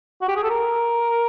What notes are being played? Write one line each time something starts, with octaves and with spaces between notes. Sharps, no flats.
F#4
G4
G#4
A4
A#4